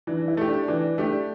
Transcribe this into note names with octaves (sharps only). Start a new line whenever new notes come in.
E3 D4
E4
A3 G4
D4
E3 D4
A3 D4 G4